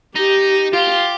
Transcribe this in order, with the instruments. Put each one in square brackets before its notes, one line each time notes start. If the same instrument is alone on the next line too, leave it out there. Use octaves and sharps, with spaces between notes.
[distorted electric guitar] D#4 [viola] G4
[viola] F4 [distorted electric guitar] G4